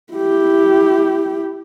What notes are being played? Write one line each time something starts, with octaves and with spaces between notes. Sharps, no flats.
E4 G4